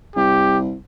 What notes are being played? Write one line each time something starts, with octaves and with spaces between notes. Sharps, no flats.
C2 G4